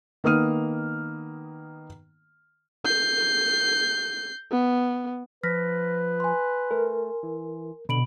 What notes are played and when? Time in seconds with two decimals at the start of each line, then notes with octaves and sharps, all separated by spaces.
0.24 D#3 A#3 B3 D#6 F6 D#7
2.84 G6 C7
4.51 B3
5.43 F3 B4 F6 A#6 B6
6.20 G#5 C6
6.71 A3 A#4
7.23 E3
7.89 B2 D3 B5 D7 F#7